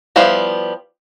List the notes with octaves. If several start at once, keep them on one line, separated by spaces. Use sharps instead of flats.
F3 G3 B3 E4 F5